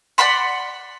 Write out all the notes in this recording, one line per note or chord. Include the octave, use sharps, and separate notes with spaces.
D5 F#5 B5 C6